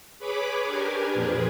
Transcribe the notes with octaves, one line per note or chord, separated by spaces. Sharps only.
G#4 B4 C#5 B5 D6
D4 G4 A#4 B4 G#5
F2 A#2 F3 G#4 B4